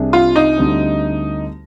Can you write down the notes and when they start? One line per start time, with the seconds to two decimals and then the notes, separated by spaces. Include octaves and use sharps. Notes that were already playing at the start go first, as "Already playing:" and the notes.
Already playing: C2 C3 G3 D4 G#4
0.13 F4
0.36 D#4
0.58 D2 D3 G3 C4